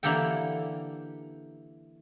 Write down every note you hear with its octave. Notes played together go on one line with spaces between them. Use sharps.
D3 E3 A#3 G4 A4 G5